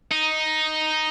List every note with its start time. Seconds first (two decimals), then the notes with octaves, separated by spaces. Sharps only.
0.12 D#4